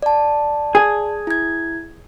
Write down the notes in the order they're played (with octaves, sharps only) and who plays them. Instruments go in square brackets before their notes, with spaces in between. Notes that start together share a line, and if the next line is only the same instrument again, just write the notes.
[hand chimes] D5 A5
[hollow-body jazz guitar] G#4
[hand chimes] E4 G#6